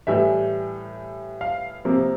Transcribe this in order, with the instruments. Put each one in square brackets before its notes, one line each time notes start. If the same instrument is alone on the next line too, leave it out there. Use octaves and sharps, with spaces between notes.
[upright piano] A2 E3 G3 E5
F5
C3 F3 A#3